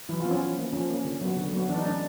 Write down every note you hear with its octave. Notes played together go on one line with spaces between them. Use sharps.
E3 F#3 E4
F3 F4
B3
C#4
F3
A#3 C#4
F3 C#4
A#3 C#4
D3
F#3 B3
D3
F#3 B3
E3 D4
D#4
A3 C#4 D4